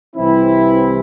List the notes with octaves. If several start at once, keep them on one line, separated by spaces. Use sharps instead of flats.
C2 C3 E3 C4 E4